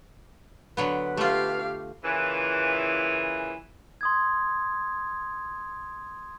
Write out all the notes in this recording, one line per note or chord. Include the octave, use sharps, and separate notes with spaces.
D3 F#3 B3 B4
A3 F4 G4 F5
A#2 C#3 E3
C6 D#6 G#6